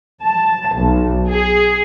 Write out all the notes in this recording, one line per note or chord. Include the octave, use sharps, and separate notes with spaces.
A5
B1
G#4